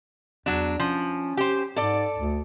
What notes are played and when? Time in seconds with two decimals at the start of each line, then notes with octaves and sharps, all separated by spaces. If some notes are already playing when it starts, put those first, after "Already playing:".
0.46 E2 F#3 D4
0.80 F3 C#4
1.37 G4 C5
1.76 G#2 A4 D5
2.17 D2